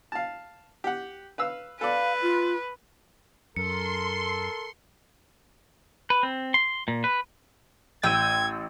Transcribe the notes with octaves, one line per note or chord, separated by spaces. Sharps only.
F5 A5
G4 F#5
B4 F5 E6
A4 B4 D5 F5
F4
F#2 A4 A#4 C6 C#7
B4
C4
C6
A#2
B4
A1 G5 E6 G#6 D#7